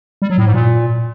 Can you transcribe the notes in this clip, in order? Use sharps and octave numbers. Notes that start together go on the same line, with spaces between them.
G3
F#3
A2
G#2
A#2